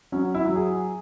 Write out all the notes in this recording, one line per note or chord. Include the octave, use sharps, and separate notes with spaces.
F#3 C#4
E4
F#3
G#4